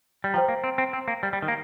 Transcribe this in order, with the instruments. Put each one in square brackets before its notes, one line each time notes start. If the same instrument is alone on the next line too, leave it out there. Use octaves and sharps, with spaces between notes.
[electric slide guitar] G3
[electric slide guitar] F3 [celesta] C5 G5 A#5
[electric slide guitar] A#3
C4
C4
C4
A#3
G3
G3
D#3
A#3